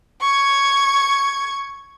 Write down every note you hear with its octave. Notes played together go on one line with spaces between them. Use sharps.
C#6 G#6